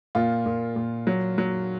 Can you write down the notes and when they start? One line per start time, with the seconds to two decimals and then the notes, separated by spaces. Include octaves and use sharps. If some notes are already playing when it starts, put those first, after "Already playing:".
0.15 A#2 F4
0.46 A#2
0.76 A#2
1.07 F#3
1.38 F#3